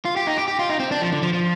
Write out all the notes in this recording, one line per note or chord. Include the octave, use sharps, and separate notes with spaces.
F4
G4
D#4
G4
G4
F4
D#4
C4
D4
F3
D3
F3
F3